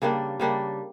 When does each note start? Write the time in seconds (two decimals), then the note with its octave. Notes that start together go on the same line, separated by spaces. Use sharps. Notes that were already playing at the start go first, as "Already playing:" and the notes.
0.02 C#3 G3 A#3 D4
0.40 C#3 G3 A#3 D4